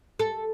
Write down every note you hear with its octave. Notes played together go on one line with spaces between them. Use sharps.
A4